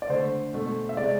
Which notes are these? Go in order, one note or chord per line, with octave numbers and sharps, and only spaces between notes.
D5
D3 A3 C5
B2 A3
E5
C3 G#3 D5